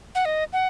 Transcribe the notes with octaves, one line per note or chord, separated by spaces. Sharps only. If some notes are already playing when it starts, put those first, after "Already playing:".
F#5
D#5
F#5